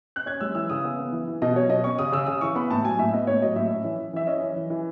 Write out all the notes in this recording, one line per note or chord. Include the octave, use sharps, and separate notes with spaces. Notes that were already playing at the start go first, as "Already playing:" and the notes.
F#6
C#4 G#6
G#3 E6
E3 E6
C#3 D#6
B3
B3
E3
E3
B2 D#5
F#3 C#5
B2 D#5
C#4 C#6
C#3 D#6
C#3 E6
C#3 D#6
E3 C#6
B3 B5
A2 A5
F#3 G#5
A2 E5
B3 D#5
A2 C#5
F#3 D#5
A2 E5
C#4
E3
E3
E3 E5
C#4 D#5
E3
E3
E3